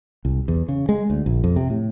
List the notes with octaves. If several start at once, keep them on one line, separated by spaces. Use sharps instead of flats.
C2
E2
C#3
G#3
D2
A#1
F2
C3
A2